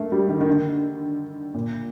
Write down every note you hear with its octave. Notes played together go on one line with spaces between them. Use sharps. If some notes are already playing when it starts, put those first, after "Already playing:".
Already playing: A3 A#3
G3
D#3
D#3
D3
A#2